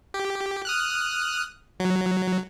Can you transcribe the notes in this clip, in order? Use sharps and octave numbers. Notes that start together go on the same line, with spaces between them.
G4
D#6 F6 F#6
F#3